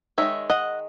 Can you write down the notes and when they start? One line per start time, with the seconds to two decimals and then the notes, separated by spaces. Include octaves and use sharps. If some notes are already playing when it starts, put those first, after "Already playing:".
0.18 D#3 G#3 D#4 C#5 E5
0.50 D#5 F#5